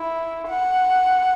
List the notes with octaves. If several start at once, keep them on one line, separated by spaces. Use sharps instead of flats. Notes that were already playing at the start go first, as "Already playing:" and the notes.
Already playing: E4
F#5